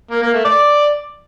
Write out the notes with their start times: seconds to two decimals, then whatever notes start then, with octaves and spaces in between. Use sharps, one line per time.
0.11 A#3
0.22 A#3
0.34 A3
0.45 D5